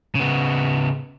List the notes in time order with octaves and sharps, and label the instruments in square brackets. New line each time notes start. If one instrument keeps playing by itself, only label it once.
[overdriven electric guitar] C#3 B3